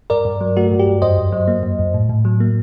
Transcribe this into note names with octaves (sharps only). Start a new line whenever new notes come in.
G2 A#4 D5
G2
F#3
A3 F#4
G2
G4
G2
F#2 C5 D#5
F#2
F#3
A#3
F#2
F#2
A2
A2
F#3
A#3